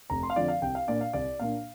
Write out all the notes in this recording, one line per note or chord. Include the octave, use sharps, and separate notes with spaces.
F1 A#5
C6
F5
F2 D3 F3 D5
F5
C2 G5
F5
A#2 A#3 D4 D5
F5
C2 D5
A#2 A#3 D4 F5